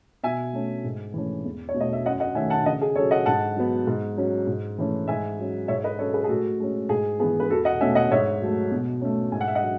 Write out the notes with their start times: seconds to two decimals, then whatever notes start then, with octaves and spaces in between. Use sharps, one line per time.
0.23 B2 E5 G#5
0.53 A3 C#4
0.84 G#2
1.14 E3 A3 C#4
1.45 E2
1.69 C#5
1.74 B2 A3
1.80 D#5
1.93 E5
2.05 F#2 D#5 F#5
2.20 D#5 F#5
2.35 D#3 A3 C#4 E5 G#5
2.50 F#5 A5
2.65 C#3 D#5 F#5
2.81 G#4
2.95 F#3 C#4 A4 C#5
3.11 D#5 F#5
3.26 G#2 F#5 A5
3.56 F#3 B3
3.87 G#2
4.17 F#3 C#4
4.47 G#2
4.78 E3 A3 C#4
5.08 G#2 E5 G#5
5.39 F#3 C#4
5.68 G#2 C#5 E5
5.84 B4 D#5
5.99 F#3 C#4 A4 C#5
6.14 G#4 B4
6.24 G#4
6.29 A2 F#4 A4
6.60 G#3 C#4
6.89 G#2 G#4
7.20 E3 B3 G#4
7.40 B4
7.50 E2 F#4 A4
7.65 D#5 F#5
7.81 B2 A3 C#4 E5 G#5
7.95 D#5 F#5
8.11 G#2 C#5 E5
8.41 F#3 A3
8.71 B2
9.01 A3 C#4
9.32 G#2 G#5
9.41 F#5
9.48 E5
9.55 D#5 F#5
9.62 F#3